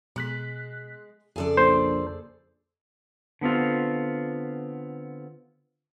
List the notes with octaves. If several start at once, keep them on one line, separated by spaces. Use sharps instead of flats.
B2 G#3 F#6 B6
F2 C#3 G#4 A4 D5
A#1 C5
D3 B3 C4 F4